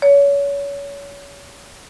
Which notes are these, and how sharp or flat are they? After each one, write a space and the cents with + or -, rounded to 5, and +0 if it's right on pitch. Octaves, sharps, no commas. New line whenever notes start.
C#5 +30